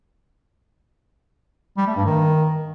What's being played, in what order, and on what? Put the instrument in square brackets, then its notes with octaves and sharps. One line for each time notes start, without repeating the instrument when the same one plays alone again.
[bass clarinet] G3
A3
G2
D#3